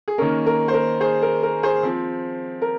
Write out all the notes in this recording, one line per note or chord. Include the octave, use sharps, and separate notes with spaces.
G#4
D#3 A#3 C#4 A#4
A#4
C5
A#4
G#4 C5
A#4
A#4
G#4 C5
F3 C4
A#4